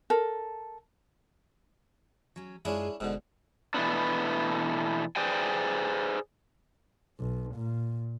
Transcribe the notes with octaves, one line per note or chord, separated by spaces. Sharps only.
A4 A#4
F#3 C#4
F#2 G#3 C#4 D4 E4 F4
F1 G#2 B2 D3 C#4
B2 E3 A3 B3 D4
G#4 B4 C5 D5 G5 G#5
B1
A#2